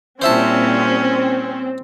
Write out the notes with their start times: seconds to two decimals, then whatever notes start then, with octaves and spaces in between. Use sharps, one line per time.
0.22 A#2 G3 C4 C#4 E4 C5 E5 A5